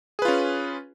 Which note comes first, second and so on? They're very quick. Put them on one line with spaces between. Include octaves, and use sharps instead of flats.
G#4 B4 F4 C#4